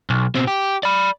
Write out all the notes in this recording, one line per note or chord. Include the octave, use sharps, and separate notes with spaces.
B1
B2 C4
G4
D5 B5